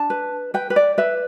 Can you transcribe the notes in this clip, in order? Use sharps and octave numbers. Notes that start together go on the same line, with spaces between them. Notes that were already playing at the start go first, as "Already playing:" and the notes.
Already playing: D4 A5
B4
B4 G5
B4
D5
B4 E5